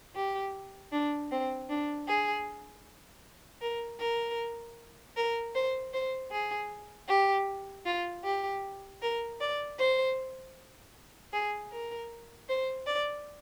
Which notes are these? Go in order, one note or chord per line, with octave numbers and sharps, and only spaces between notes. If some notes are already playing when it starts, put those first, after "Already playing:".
G4
D4
C4
D4
G#4
A#4
A#4
A#4
C5
C5
G#4
G4
F4
G4
A#4
D5
C5
G#4
A#4
C5
D5